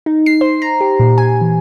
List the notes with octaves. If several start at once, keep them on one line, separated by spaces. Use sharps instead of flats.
D#4
C7
C5
A#5
G4
A#2
G#5
E3